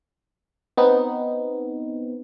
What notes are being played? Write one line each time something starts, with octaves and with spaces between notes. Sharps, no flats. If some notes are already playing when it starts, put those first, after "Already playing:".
B3 C4 D#4